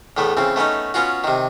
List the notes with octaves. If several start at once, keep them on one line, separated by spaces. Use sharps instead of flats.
E2 A2 A3 B3
C#3 E3 C4
A3 B3 C#4 D#4
B3 C#4 F4 F#4
C3 D#3